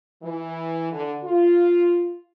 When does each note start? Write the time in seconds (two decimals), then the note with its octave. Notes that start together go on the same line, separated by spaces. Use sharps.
0.23 E3
0.92 D3
1.23 F4